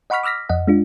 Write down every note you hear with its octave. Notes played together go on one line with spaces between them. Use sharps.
D#5 F#5 B5 C#6 F6 B6
D6 E6 F6 A#6 B6
F2 D#5 F#5
G#3 D4 F4